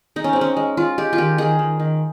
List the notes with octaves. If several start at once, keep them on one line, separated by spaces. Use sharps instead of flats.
G#3 D#4
C#4
G#3 C4
C#4
G#3
G#3 F4
G#3 G4
F4
D#3 G4
D#3 G#4
D#3
D#3